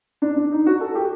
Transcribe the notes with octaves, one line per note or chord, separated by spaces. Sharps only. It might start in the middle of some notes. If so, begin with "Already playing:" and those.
D4
D4
D#4
F#4
A4
G4